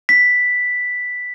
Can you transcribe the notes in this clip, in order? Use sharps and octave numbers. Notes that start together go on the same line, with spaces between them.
B6